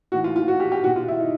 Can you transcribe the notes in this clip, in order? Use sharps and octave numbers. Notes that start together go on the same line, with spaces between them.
A2 E3 F#4
F4
F4
F#4
G4
G4
B2 F#4
F4
E4
D#4